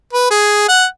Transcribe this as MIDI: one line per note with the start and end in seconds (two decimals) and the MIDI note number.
0.13 0.26 71
0.30 0.67 68
0.68 0.85 78